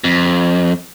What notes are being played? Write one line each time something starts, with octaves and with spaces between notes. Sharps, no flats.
F2